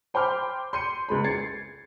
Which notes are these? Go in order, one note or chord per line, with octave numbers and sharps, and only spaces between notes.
C5 G5 B5 C6 D6 F6
C6 G6 C#7 D#7
C#2 G#3 B5
G#6 A6 C7 C#7